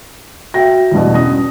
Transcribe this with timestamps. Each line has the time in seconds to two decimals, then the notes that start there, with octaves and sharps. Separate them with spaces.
0.54 F#4 E5 G5 A#6
0.91 E2 G2 B2
1.14 C#4 D#6 A#6